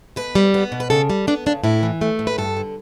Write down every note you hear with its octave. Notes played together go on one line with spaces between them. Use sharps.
B2 B4
G3
B3
B2
B4
C#3 A4
G3
B3 D4
C#3 D4
A2 E4
E3
A3
A2
B4
G2 A4
D3